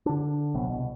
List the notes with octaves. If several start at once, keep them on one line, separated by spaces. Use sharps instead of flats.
D3 D4
A#1 C3 F#3 B3
C2 B2